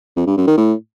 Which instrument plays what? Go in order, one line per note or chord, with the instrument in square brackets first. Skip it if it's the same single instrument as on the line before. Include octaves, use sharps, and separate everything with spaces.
[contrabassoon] F2
G2
F#2
D#3
A2